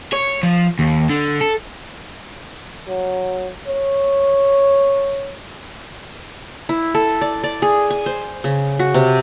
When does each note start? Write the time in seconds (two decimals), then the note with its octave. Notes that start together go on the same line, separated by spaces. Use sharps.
0.13 C#5
0.43 F3
0.79 D#2
1.09 D3
1.41 A4
2.88 F#3
3.67 C#5
6.69 E4
6.95 A4
7.21 D5
7.44 D5
7.62 G#4
7.90 G#5
8.06 C5
8.44 C#3
8.79 F#4
8.94 C3